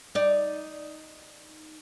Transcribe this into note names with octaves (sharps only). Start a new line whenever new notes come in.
D#4 D5